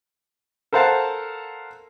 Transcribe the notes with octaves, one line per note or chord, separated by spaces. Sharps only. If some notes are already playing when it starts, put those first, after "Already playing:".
A4 A#4 C5 F5 F#5 A5